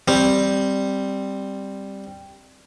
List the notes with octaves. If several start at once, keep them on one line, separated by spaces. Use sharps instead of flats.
G3 C4